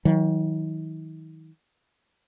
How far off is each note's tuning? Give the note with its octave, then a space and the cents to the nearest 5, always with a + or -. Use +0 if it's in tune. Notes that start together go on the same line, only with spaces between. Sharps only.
D#3 +40 F#3 +0